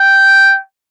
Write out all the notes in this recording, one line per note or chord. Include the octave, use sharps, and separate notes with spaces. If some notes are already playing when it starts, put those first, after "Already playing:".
Already playing: G5